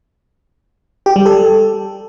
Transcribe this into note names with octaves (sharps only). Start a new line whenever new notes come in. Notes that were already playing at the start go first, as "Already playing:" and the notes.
G4
G3
A4